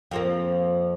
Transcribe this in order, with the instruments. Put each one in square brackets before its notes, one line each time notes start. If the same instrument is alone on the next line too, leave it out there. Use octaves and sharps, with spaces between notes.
[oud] F2 F3 A#3